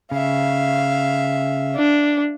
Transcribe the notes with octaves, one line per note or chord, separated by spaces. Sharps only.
C#3 E5 F5
D4